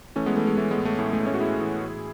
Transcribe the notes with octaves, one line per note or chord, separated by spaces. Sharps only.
E3 A3 C#4
G#3 B3
E3 A3
G#3
E3 A3
G#3 B3
A2
A3
A2 A3
A3
A2
A3 C#4
F#4
A2 E4 G#4
E3
A2